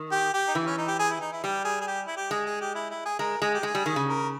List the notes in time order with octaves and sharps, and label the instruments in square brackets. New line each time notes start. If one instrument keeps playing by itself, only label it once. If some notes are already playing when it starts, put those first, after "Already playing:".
Already playing: [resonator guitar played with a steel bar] D#3
[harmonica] G4
G4
D#4
[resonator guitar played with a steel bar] E3 [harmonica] E4
[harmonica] C#4
D#4
G4
G#4
E4
D#4
E4
[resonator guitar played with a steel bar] G3 [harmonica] G4
[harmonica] G#4
G#4
G4
E4
G4
[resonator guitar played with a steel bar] G#3 [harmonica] G#4
[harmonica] G#4
G4
E4
E4
G#4
[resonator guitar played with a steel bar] G#3 [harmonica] A#4
[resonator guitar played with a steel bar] G#3 [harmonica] G#4
[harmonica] G4
[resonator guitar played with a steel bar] G#3
[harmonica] G#4
[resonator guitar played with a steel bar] G3
D#3
C#3
[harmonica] A#4